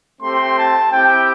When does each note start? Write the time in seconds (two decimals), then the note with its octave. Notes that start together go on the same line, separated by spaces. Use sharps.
0.21 A3 C4 G4 C6
0.57 A5
0.92 C4 E4 G4 G5